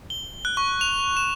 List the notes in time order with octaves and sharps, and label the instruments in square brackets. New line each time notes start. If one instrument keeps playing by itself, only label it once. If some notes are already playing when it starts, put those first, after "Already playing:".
[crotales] G7
F#6
C#6
F7
E7